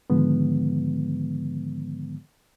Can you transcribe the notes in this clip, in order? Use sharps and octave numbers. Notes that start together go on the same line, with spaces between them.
G#2 D3 D#3 F3 G#3 B3